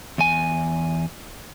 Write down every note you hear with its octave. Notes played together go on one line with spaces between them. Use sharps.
E2 G#5